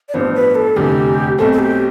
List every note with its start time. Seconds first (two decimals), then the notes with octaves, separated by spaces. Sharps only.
0.09 D5
0.14 A1 G2 F3 B3 C5
0.35 B4
0.55 A4
0.76 F1 E2 D3 G4
1.38 B1 B2 A3 C4 A4
1.52 A4
1.59 G4